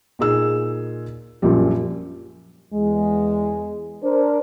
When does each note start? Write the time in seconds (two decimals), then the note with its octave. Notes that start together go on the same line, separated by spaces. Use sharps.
0.19 A#2 D#4 G#4 E6
1.42 A#1 F#2 A#2 F3 G3
2.74 E2 G#3
4.03 D4 A#4 C5